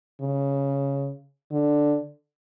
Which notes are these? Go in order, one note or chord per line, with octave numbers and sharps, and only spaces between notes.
C#3
D3